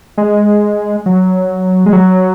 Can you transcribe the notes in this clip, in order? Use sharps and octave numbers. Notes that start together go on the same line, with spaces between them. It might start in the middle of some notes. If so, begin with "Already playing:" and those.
G#3
F#3
G#3
F#3